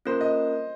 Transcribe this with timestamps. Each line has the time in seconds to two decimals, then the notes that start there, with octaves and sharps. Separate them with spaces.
0.05 A#3 C#4 F4 A#4 C5
0.21 D#5